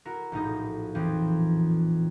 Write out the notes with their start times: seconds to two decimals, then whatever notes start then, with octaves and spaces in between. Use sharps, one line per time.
0.05 E4 F#4 A#4
0.32 A#1 A2 D#4 A#6
0.95 F2 E3 F3 C4